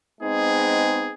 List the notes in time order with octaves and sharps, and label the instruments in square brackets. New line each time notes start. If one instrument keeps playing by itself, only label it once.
[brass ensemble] G#3 B3 C4 D#4 G#4